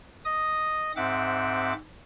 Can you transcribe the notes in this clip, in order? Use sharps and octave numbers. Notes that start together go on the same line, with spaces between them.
D#5 D#6
G#2 C4 E5 F#5 D6